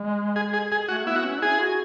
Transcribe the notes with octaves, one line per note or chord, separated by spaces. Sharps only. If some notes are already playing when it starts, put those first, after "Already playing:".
Already playing: G#3
G#4
G#4
G#4
A3 F#4
B3 E4
F#4
C#4
E4 G#4
F#4